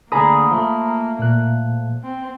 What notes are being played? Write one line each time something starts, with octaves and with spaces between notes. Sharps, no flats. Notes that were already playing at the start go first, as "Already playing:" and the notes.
D2 D3 A#3 G#4 A#5 B5 D#6
F3 A3
A#2 F#6
C4